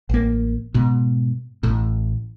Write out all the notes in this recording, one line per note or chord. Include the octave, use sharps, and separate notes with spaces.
A1 A#3
G#2 B2
A1 A2